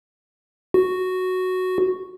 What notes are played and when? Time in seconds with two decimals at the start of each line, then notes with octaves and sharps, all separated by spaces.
0.74 F#4